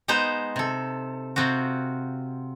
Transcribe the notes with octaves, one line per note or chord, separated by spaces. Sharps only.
G#3 B3 D#4 C5 A#5
C3 A4
C3 C4 F4 F#4